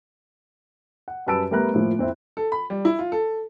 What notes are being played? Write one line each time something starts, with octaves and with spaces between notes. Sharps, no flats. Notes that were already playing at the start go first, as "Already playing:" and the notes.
F#5
F#2 G3 B4 A5 E6 D7
G3 A3 B3 A#4 A#5 F#6
A2 F3 A#3
F2 C4 E4
A4
B5
G3
E4
F4
A4